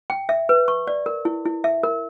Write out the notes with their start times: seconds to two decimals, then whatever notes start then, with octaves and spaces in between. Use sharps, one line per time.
0.10 G5
0.29 E5
0.49 B4
0.68 C#6
0.87 D5
1.06 A#4
1.25 E4
1.45 E4
1.64 E5
1.83 A#4